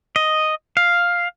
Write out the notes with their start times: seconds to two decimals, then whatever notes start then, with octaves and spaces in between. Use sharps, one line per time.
0.16 D#5
0.77 F5